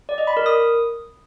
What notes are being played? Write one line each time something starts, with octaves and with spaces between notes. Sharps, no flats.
D5
D#5
B5
A#4
D#6